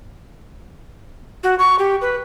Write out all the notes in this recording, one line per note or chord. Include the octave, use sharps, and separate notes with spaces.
F#4
C#6
G4
B4